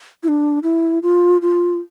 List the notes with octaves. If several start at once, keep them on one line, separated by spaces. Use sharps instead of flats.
E4
D4
E4
F4
F4